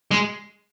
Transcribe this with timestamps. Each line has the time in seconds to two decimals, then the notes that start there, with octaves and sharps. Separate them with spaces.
0.11 G#3